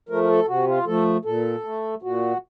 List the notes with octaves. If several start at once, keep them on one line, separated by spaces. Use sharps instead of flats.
F3 A3 A#4
A#4
A4
C3 F#4
F4
F3 A3 A4
A#2 A4
A3
A#2 F#4